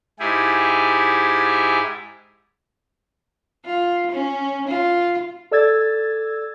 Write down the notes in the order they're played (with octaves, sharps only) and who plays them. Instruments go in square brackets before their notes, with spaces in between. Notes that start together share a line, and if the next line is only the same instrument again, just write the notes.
[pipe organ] G#2 E4 G4 G#4
[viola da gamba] F4
C#4
F4
[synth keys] A4 D5 E6 G#6 A6